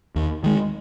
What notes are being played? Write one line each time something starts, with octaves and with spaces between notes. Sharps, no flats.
D#2
D#3 G#3